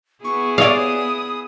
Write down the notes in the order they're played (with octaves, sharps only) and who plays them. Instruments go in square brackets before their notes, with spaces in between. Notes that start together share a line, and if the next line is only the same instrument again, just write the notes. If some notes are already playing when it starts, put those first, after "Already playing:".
[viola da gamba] B3 E4 G#4 [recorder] C#6
[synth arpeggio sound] C#5 D5 [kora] F5 [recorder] D#6